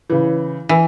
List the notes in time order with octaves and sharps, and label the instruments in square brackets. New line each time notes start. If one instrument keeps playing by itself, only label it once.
[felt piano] C#3 E3
[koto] E3